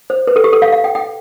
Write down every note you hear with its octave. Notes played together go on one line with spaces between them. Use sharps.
C5
B4
A4
G4
A4
F5
F5
G5
G5